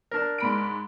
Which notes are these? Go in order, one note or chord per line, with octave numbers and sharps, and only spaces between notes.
D4 A#4
G#2 B5 D7